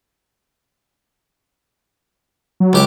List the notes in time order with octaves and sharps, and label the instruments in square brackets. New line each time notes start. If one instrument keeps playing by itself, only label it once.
[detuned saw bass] F#3
[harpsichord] C#2 G4 D6